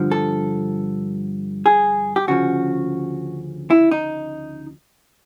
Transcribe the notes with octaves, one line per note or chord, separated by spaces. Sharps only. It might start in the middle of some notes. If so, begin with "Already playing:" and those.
Already playing: G2 D3 F3
A4
G#4
G4
D2 C#3 F3 F#4
E4
D#4